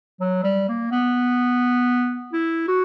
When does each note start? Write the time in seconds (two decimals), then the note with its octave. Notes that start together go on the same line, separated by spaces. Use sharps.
0.20 F#3
0.44 G3
0.69 A#3
0.91 B3
2.33 E4
2.68 F#4